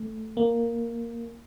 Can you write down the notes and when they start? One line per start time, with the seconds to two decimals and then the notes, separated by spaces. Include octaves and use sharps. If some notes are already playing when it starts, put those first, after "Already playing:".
Already playing: A3
0.37 A#3